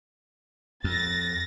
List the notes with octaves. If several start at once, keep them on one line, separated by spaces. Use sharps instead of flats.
F2 A6 A#6